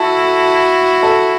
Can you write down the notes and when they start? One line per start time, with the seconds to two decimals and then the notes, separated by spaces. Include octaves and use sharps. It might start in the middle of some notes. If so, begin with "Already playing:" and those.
Already playing: E4 F#4 A4
1.03 A4